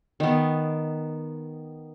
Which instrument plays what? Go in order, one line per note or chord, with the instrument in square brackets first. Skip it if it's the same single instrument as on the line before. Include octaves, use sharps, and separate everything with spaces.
[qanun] D#3 B3